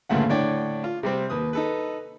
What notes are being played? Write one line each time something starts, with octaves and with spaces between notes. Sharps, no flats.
D2 G2 A#2 C#3 A3 F#5
A2 D3 C#5 D5 G5
F4
C3 G3 C4
D#2 B4 D#6
D#4 A4 B4